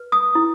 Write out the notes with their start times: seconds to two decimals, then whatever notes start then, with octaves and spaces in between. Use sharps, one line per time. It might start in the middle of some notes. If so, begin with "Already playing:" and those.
Already playing: B4
0.12 D#6
0.35 E4